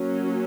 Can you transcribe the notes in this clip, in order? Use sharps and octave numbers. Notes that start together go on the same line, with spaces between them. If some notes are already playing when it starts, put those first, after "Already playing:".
Already playing: F#3 A#3 C#4